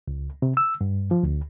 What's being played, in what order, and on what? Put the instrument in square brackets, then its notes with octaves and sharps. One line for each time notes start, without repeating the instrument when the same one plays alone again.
[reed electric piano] C#2
C3
E6
G2
F3
D2